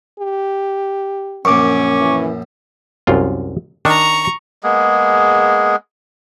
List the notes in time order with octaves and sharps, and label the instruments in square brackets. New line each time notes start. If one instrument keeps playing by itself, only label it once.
[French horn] G4
[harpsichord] A#1 F#2 [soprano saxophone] C#4 [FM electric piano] C#6 D6
[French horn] E3
[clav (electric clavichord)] C2 F#2 F4
[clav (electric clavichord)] D#3 D4 [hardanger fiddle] A#5 C#6
[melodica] G#3 A#3 B3 G#4